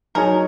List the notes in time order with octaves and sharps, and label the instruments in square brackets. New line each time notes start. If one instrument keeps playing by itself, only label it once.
[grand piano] F#3 D#4 G#4 C#5 [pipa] A#4